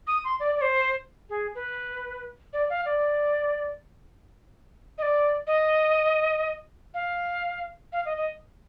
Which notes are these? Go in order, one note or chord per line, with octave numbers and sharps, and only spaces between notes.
D#6
C6
D5
D5
C5
G#4
B4
D5
F5
D5
D#5
D5
D#5
F5
F5
D#5
D#5